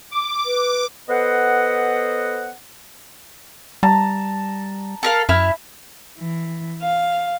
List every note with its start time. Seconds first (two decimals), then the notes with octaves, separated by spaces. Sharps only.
0.11 D6
0.45 B4
1.09 B3 A4 B4 C5 D#5 F#5
3.83 G3 A5 A#5
5.03 A4 A#4 F5
5.29 F#2 E4 E5 F6
6.19 E3
6.82 F5